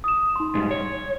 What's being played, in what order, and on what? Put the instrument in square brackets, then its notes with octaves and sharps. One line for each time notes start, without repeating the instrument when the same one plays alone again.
[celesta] D#6 E7
D#4 C6
[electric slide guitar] G#2 G3
C#5